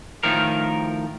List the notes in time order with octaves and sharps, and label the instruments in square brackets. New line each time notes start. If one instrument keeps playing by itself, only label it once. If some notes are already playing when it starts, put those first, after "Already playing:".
[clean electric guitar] A2 D#3 F3 A#4